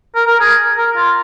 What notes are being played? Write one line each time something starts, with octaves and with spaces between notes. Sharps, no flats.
A#4
A#4
G#4
A#4
F4